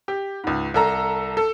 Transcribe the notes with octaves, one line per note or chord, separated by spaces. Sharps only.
G4
C#2 G#2
C2 A4 A#5
A4